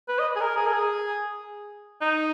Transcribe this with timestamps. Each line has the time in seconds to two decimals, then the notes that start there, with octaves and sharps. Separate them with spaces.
0.08 B4
0.19 D#5
0.36 G#4
0.40 A#4
0.56 G#4
0.67 A#4
0.73 G#4
2.01 D#4